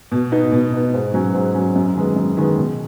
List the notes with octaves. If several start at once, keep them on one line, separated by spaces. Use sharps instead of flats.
B2
B3 D#4
B2
B3 D#4
G#2
F#3 C#4
G#2
F#3 C#4
F#2
D#3 G#3 B3
F#2
D#3 G#3 B3
B2